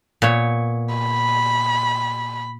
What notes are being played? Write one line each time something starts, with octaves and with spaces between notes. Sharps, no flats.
A#2 B3 C#5
B5